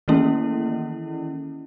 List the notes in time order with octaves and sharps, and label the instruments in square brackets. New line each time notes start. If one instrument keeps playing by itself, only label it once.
[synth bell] D#3 E3 A3 A#3 C#4 E4